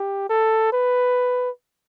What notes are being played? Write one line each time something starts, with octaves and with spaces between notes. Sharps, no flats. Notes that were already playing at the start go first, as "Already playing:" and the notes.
Already playing: G4
A4
B4